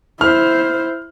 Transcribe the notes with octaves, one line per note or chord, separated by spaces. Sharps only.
E4 C5 F6